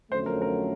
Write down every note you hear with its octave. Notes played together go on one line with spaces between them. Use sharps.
F2 D3 F#3 A3 C#4 C5
A#4
A#4